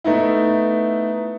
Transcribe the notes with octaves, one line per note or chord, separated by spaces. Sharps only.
A3 B3 D#4 E4